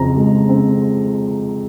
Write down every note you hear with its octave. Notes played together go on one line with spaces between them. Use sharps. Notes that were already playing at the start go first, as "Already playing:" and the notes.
Already playing: F2 C#3 C4 A#5
G#3
C4